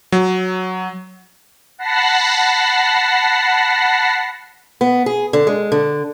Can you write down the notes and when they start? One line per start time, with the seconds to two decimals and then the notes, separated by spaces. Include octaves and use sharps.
0.12 F#3
1.78 F#5 A5 B5 A#6 C7
4.81 B3
5.06 G#4
5.33 D3
5.47 G#3
5.72 D3